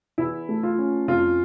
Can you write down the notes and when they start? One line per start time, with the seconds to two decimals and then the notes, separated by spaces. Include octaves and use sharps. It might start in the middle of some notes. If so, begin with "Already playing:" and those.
0.18 E2 E4
0.49 A3
0.63 F4
0.78 C#4
1.08 F2 F4